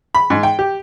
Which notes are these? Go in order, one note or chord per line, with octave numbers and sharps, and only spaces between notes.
B5
G#2
G5
G4